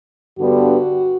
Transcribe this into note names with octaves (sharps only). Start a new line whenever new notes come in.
G2 D3 G3 B3 D4 F#4